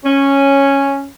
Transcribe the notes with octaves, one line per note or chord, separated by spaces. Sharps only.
C#4